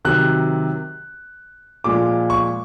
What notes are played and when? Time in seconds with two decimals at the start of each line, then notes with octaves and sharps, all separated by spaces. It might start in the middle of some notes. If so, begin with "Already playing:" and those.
0.05 C3 D#3 F#3 F#6
1.84 A#2 F3 G#3 D6
2.30 C#6